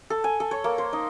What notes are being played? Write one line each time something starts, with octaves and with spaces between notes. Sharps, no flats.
A4
G#5
A4
C#5
A#3
C5
D#4